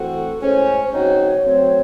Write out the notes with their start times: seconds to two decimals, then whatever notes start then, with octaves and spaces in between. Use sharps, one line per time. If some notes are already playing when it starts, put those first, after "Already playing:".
Already playing: E3 A3 C4 F#4 A4
0.41 A2 G#3 C#4 C5
0.83 C5
0.92 C#3 F#3 C4 D#4 F#4 C#5
1.43 F#3 A3 C4